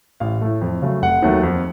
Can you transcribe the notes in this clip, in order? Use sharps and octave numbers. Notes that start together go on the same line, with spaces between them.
A1 F5
A2 A3
F2
C#3 F#3 A3
F1 F#5
D#2 D#3 F#3 A3
F2